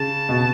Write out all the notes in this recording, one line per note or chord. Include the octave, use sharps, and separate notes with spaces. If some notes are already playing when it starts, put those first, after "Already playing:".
Already playing: C#3 A5
B2